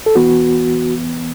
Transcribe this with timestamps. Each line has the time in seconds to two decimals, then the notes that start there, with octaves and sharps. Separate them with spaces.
0.06 A4
0.15 E2 E3 B3 F#4